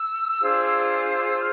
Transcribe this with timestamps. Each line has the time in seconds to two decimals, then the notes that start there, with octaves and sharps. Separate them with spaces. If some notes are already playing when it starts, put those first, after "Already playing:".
Already playing: E6
0.41 D4 F4 G#4 C5
1.13 E6
1.38 F6